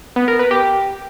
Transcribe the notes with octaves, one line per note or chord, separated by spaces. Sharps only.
B3
A#4
B4
G4